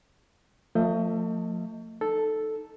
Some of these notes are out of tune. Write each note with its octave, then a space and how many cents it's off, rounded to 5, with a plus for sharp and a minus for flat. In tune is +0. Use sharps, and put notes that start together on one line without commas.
F3 +20 A3 +40 D#5 +15
D#4 -10 A4 +0